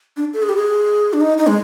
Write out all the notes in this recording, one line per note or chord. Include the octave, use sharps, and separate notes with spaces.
D4
A4
G#4
G4
G#4
D4
D#4
D#4
G#3